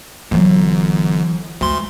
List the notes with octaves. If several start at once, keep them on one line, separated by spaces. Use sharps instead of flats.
G1 E3 F#3
D2 G#3 C6